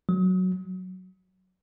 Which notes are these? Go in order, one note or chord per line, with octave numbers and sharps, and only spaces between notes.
F#3